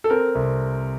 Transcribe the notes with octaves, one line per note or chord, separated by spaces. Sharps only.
A4
C4 A#4
C2